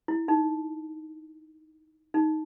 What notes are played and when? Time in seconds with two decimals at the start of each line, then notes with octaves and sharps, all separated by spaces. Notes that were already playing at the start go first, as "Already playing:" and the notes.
0.08 E4
0.28 D#4
2.14 D#4